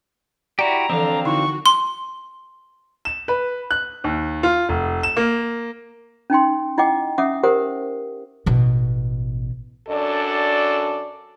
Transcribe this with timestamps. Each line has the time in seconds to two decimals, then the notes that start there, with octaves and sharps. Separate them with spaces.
0.59 E4 F#4 G4 D5 A#5
0.90 D3 E3 F3 C4 D4 F5
1.25 D3 D#4 E4 F#4 C#6
1.66 C6
3.05 E7
3.28 B4
3.71 F#6
4.04 D#2
4.43 F4
4.69 F1
5.03 E7
5.17 A#3
6.30 C#4 D#4 G5 C6
6.78 E4 D#5 F#5 G5 D6
7.18 C#4 E5 F#5 D6 D#6
7.43 G4 A#4 C5 F#5 D#6
8.46 A1 B2
9.88 F#2 D4 F#4 A4 D5